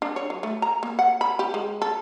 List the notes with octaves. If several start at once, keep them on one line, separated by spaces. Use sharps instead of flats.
D4
C#5
F#3
A3
A#5
A#3
F#5
B5
G4
G#3
A4